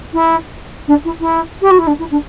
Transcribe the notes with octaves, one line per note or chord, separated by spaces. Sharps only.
E4
D4
E4
E4
G4
F#4
E4
D4
E4
D4